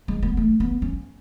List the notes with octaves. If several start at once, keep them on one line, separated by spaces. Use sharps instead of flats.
G#3
B3
A3
B3
C#4